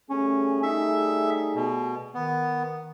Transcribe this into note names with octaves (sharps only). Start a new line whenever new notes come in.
G3 A3 C#4 G#4
D#4 E5
B2
D#3 B3